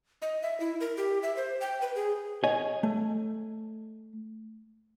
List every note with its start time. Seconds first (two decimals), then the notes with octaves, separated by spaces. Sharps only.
0.22 D#5
0.42 E5
0.60 E4
0.80 A#4
0.97 G4
1.23 E5
1.36 C5
1.61 G5
1.81 B4
1.96 G#4
2.44 C#5 D#5 G#5
2.83 A3